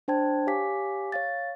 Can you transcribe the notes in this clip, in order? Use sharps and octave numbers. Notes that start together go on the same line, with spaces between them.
D4 C5 G5 A5 G#6
G4 C#5 F5 G#5 D6 B6
C#5 F5 A6